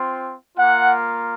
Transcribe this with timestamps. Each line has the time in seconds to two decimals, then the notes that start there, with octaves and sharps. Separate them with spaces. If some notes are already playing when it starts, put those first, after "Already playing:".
Already playing: C4 F4
0.57 A#3 F4 F#5